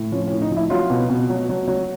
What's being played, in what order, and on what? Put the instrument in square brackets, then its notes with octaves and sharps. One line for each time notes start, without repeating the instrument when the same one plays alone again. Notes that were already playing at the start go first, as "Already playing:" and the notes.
Already playing: [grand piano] A2
F3 C#4
C#4
A2
D#4
F3
E4
F#3 F4
B2
B2
F#3
F#3
F#3